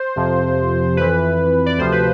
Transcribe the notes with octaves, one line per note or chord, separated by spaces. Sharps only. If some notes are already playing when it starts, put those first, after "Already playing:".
Already playing: C5
F2 C3 F3
F2 E3 B4
D5
D2 C3 F3 C5
B4